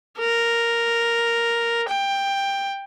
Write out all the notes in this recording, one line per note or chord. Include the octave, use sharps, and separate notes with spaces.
A#4
G5